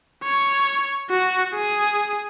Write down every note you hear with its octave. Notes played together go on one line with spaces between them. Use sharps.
C#5
F#4
G#4